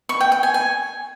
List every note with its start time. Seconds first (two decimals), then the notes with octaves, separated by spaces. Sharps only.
0.09 C#6
0.21 G5
0.32 G5
0.43 G#5
0.54 G#5